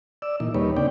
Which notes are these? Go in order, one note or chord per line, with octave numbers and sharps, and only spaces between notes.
D5 E6
A#2 E3 D#4
D#2 G3 A#3 D#4 B4 C#5
C#3 C4 D4 D5 G5